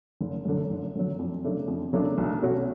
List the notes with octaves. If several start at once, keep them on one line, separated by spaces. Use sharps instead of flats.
F#1
F#2 D3 F#3
F#1
F#2 D3 F#3
F2
C#3 F#3 A3 D4
F2
C#3 F#3 A3 D4
B1
B2 A3 C#4 F#4